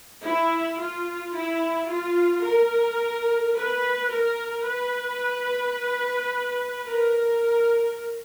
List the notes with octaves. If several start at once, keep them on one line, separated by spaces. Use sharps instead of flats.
E4
F4
E4
F4
A#4
B4
A#4
B4
A#4